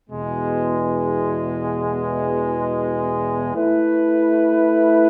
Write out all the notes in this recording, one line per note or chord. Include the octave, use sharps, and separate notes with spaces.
E2 B2 G#3
A3 E4 B4